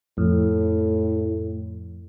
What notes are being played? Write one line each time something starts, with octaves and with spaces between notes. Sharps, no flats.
F2 A2